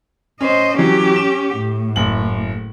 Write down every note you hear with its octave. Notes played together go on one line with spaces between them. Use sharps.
C#4 C5 D#5
E3 F#3 C#4 G4
E7
A2
F#1 F#7